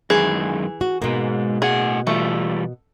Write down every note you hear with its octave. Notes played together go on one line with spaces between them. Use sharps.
F#2 D#3 E3 G#3 G#4
F#4
G#2 B2 G#3 A#3
A2 G#4 F#5
E3 G3 A3 F4